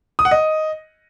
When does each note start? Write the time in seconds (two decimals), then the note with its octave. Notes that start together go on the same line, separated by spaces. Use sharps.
0.19 D#6
0.25 F#5
0.31 D#5